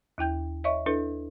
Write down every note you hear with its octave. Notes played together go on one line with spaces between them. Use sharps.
D#2 E4 G5 G6
C#5 D#5 E5 C#6
D4 E4 A4 B4